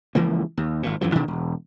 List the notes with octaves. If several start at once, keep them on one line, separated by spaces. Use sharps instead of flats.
C#2 E3 F3 A#3
D#2
G#1 A#2
F#2 E3 F3
B2 D#3 E3 D4
E1